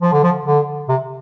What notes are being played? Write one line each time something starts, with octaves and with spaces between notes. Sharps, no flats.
F3
D3
F3
D3
C3